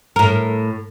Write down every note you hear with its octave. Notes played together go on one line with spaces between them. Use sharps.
A2 A#4